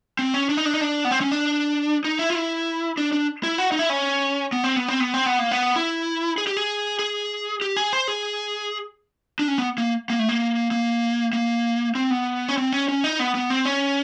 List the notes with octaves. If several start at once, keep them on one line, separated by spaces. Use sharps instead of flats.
C4
C#4
D4
D#4
D4
D#4
D4
B3
C4
C#4
D4
D#4
E4
F4
E4
D4
D4
E4
F#4
D#4
E4
C#4
B3
C4
B3
C4
B3
C4
B3
A#3
B3
E4
G#4
G4
G#4
G#4
G4
G#4
C5
G#4
D4
C#4
B3
A#3
A#3
A3
A#3
A#3
A#3
C4
B3
C#4
C4
C#4
C#4
D#4
B3
B3
C4
C#4